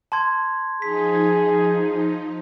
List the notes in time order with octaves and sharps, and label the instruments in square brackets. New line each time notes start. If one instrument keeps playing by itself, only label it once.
[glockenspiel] A5 C6 G#6
[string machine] F3 D#4 [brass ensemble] G#4 [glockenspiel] B6